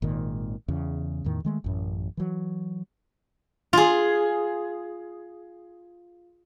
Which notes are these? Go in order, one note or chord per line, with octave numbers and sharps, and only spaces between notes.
G#1 A#2 D#3
E2 C#3
E2 A2 D#3
D#3 G#3 A3
A1 F#2
E3 F#3
F4 G#4